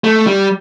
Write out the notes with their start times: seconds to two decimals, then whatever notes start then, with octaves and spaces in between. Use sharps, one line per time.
0.04 A3
0.27 G3